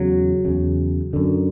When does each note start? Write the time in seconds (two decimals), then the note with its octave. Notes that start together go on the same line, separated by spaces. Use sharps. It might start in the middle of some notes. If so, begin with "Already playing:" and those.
Already playing: E2 C#3 F#3
0.45 E2 C#3
1.13 F#2 D3